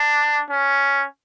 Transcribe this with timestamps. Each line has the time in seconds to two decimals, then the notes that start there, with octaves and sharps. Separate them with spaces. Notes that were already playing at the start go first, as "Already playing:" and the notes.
Already playing: D4
0.50 C#4